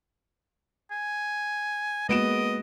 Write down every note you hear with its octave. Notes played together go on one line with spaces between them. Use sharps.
G#5
G#3 A#3 B3 F#4 D#5 D7 E7